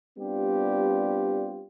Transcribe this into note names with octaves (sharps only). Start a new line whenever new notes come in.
G3 B3 C4 D4 F4 G4